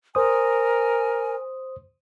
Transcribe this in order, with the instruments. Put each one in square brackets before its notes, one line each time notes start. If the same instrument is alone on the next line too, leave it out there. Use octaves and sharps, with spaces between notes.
[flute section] A#4 G#5 [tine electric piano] C5 D#6